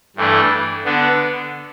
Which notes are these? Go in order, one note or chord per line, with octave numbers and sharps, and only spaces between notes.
G2 E3 A3 D4
D3 B3 D4